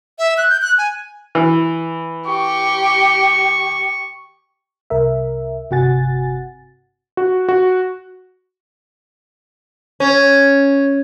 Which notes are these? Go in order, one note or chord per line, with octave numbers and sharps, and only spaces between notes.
E5
F#6
G6
F#6
G#5
E3
G4 C#6
C2 A#4 E5
G1 C3 F#4 F#5 G#5 A6
F#4
F#4
C#4